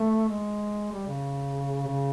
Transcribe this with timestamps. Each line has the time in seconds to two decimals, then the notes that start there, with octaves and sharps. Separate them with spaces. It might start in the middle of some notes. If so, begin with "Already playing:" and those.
Already playing: A3
0.29 G#3
0.92 G3
1.07 C#3
1.87 C#3